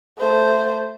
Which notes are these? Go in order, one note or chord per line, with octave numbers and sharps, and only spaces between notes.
A3 C5